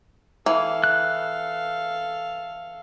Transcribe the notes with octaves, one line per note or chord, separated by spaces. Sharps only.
E3 A4 F5
F#6